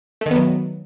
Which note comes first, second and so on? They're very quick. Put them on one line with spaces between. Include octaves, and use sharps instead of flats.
A3 D#3 B3 F#3